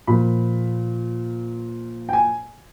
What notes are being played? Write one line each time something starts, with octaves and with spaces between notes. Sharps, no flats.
A#2 F3 A#3 B5
G5
G#5